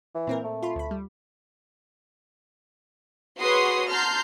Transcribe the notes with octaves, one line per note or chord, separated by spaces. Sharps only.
E3
A#2 C4 A#4
A3
F4 B5 C6
D2 B5
G3
F#4 G#4 B4 C#5 C6 D#6
A5 A#5 C6 F6 G6